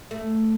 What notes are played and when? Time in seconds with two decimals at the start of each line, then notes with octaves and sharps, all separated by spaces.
0.11 A3